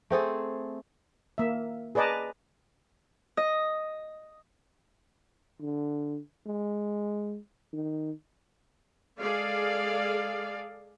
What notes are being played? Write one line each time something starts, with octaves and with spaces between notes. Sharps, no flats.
A3 C4 G#4 A4
A#3 E5
G#4 B4 D5 D#5 A5 A#5
D#5
D3
G#3
D#3
G#3 G#4 A4 D5 F5